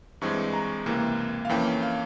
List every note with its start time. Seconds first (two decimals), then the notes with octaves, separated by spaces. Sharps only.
0.21 G2 E3 G#3 C4 C#6
0.54 A#5
0.86 C#2 C3 E3 A#3
1.45 F5
1.49 F2 E3 A#3 C#4 G5
1.83 F5